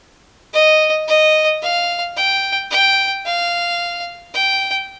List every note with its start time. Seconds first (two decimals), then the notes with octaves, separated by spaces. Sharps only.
0.53 D#5
1.08 D#5
1.62 F5
2.16 G5
2.71 G5
3.25 F5
4.34 G5